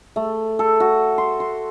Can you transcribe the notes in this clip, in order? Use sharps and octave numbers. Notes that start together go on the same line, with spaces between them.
A3
A4
F#4
C6
C6